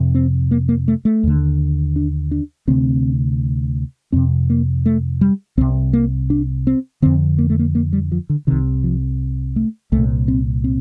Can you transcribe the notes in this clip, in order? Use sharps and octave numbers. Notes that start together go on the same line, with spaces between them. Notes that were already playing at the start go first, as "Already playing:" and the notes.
Already playing: F2 C3
C4
A#3
A#3
A3
A3
D#2 D3
D4
D4
D2 C3 C4
F2 C3 C4
A#3
A3
G3
C2 C3 C4
A#3
D4
C4
F2 D3 C4
A#3
A3
A#3
A#3
G3
F3
D3
C2 C3 D#3
F3
A3
C2 A#2 A3
C4
C4